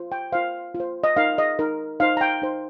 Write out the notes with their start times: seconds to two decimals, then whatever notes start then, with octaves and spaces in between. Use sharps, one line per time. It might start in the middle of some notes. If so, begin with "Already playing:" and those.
Already playing: F4 C5
0.12 G5
0.32 F4 C5 F5
0.75 F4
0.80 C5
1.04 D#5
1.16 D#4 A#4 F5
1.38 D#5
1.59 D#4 A#4
2.00 D#4 C5 F5
2.17 A#5
2.21 G5
2.42 D#4 C5